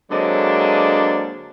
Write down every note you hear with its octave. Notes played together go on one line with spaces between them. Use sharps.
D3 F#3 G#3 A#3 C4 D4